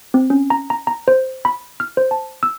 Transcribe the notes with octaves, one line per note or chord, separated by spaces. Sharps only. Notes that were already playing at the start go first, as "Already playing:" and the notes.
C4
C#4
A#5
A#5
A#5
C5
B5
F6
C5
A5
E6